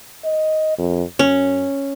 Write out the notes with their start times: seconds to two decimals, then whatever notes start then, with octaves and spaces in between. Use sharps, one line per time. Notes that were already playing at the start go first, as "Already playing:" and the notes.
0.24 D#5
0.78 F2
1.19 F#2 C#4